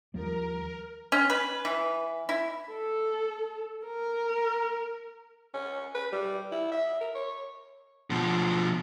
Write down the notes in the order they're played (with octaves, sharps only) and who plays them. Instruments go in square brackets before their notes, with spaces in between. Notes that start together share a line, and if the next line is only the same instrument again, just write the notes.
[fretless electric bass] D#2 F3 G3 [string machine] A#4
[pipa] C#4
B4
E3
E4
[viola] A4
A#4
[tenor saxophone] C#4
B4
G3
E4
E5
A#4
C#5
[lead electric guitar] B2 F3